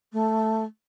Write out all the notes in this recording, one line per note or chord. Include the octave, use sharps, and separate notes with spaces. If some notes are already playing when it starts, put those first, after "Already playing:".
A3